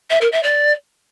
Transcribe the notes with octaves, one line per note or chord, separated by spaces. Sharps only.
E5
A#4
E5
D5